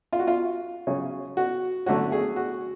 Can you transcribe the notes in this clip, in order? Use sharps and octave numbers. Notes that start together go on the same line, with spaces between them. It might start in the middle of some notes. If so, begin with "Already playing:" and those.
F4
F#4
F4
C#3 F#3 C#4
F#4
D3 F#3 A3 C#4 F#4
G#4
F#4